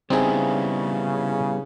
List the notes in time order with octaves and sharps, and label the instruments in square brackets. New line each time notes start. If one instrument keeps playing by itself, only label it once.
[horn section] C#3 [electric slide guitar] G3 B3 E4 [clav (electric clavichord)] C4 D#4 G#4